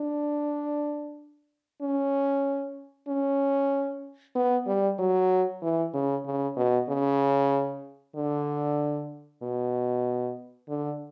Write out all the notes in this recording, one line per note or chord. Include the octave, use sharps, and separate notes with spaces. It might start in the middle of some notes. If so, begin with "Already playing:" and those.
Already playing: D4
C#4
C#4
B3
G3
F#3
E3
C#3
C#3
B2
C#3
D3
B2
D3